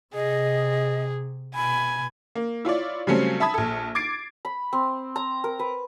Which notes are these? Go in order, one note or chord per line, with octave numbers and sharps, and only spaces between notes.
C3 G#4 D#5
B2 G#5 B5
A#3
E4 F4 C#5 D5
C#3 F#3 G3 A3 C4 C#4
E5 A5 B5 D#6 G#6
A#1 A4
D6 G#6 A6 C7 D7
B5
C4
A#5
A#4
B4